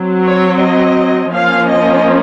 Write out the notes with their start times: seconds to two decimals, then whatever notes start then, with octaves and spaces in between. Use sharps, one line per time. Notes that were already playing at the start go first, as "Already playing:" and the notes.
Already playing: F#3 C4
0.25 C#5
0.60 D#5
1.32 F3 A#3 C#4 F5
1.68 D#5